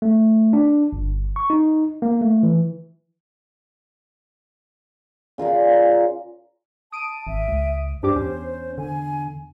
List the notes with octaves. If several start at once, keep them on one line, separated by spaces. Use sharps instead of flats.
A3
D4
G1
C#6
D#4
A#3
A3
E3
C#3 F4 A#4 D5
A5 D#6 D7 D#7
G#1 E5
C#2
G2 D4 G4 C5 D6
E2 C#4
D3 G#5